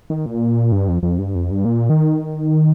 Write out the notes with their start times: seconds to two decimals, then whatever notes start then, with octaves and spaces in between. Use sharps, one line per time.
0.10 D#3
0.26 A#2
0.72 G2
0.88 F2
1.03 F2
1.19 G2
1.35 F2
1.51 G2
1.65 A#2
1.90 D#3